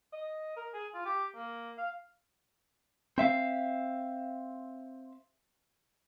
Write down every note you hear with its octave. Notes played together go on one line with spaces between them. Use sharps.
D#5
A#4
G#4
F4
G4
A#3
F5
C4 E5 F5